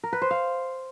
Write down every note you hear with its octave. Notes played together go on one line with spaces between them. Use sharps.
A#4
B4
C5
F5